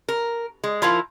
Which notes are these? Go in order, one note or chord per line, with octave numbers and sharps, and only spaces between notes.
A#4
G#3
F3 E4 F4 A#4 F5